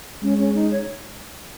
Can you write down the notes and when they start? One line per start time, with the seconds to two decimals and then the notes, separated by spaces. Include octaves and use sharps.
0.23 G#3 C#4
0.39 C#4
0.55 D#4
0.71 C#5